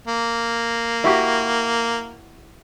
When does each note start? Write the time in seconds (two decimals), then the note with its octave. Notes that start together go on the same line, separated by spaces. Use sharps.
0.07 A#3
1.04 E4 F#4 G4